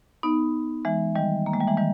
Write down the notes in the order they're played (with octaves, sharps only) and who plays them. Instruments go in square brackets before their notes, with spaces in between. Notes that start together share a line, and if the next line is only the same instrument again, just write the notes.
[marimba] B3 D#4
E3 G#3
D#3 G3
A#3
G#3
G3
E3 G#3
D#3 G3